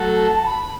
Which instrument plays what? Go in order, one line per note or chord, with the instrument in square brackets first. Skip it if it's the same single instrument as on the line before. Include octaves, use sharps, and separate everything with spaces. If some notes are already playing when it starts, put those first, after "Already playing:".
Already playing: [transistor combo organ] F#3 A3 F#4 A4
[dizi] A5
A5
B5